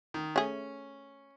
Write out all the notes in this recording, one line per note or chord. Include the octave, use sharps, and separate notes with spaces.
D#3
A3 C#4 G#4